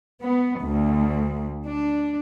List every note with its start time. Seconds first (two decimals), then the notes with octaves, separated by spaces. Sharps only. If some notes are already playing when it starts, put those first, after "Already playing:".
0.20 B3
0.60 D2
1.65 D4